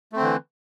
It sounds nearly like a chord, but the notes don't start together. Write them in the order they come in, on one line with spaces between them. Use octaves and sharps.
A3 C4 D3 E3